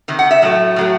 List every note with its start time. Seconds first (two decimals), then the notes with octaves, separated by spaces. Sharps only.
0.08 C3 D#3
0.19 F#5
0.31 E5
0.42 A2 F#3 A3
0.76 A2 F#3 A3